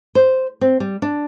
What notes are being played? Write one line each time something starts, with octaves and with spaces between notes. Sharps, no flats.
C5
C4
G3
D4